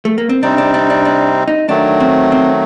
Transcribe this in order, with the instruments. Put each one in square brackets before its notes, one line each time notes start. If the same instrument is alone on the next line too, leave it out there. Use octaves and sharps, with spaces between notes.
[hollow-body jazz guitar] A3
A#3
C4
[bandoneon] C3 G3 C4 D#4 [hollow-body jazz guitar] D4
[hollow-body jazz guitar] D4
D4
D4
D4
D#4
[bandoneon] D#3 F#3 A3 [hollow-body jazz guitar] D4
[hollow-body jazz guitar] C4
C4